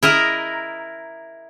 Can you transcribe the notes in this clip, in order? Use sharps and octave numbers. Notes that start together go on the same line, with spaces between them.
E4 A#4 D#5 A#5